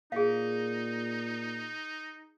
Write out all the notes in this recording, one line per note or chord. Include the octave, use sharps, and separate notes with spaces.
A#2 D#4 G#4 F5